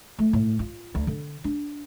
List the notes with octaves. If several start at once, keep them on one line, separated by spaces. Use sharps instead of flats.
A3
A2
F4
D2
D3
D4